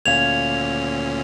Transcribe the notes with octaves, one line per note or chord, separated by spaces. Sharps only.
D2 A#2 C#4 F5 G#6 F7